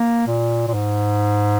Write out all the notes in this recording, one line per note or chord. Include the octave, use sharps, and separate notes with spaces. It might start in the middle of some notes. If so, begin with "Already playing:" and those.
Already playing: A#3
A#2
A#2
G#2